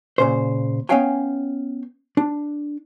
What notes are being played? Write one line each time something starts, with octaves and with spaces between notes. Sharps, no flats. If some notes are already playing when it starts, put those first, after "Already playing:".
A#2 C#3 C5
B3 C#4 C#5 F5 G5 G#5
D4